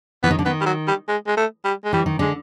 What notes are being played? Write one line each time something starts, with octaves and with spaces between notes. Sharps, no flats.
E3 B3
D#3
D3
D#3 B3
G3
F#3
G3
G#3
G#3
A3
G3
G#3
E3 G3
D#3
D3 G#3